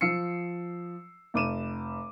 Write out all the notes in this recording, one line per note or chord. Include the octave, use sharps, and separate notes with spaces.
F3 E6 C7 C#7
F1 D6 D#7 E7